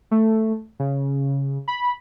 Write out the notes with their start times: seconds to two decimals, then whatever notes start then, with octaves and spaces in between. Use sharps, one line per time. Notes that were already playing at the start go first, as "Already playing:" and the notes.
0.11 A3
0.80 C#3
1.68 B5